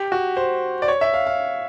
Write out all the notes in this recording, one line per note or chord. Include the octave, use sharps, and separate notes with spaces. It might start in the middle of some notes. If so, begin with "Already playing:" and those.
Already playing: G4
F#4
C5
D5
C#5
E5
F5
F5